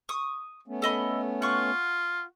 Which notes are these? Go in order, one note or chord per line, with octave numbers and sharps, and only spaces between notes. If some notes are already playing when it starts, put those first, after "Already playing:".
C#6 D#6
A3 B3 C#4
A4 D#5 B5
F4 F#5 C#6